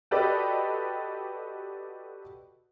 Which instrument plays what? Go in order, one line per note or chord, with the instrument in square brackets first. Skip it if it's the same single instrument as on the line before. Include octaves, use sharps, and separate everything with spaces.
[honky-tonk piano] F#4 G4 A4 B4 D5 D#5